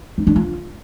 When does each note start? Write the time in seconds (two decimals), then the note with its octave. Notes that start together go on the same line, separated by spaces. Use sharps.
0.18 D#4
0.27 D4
0.36 F4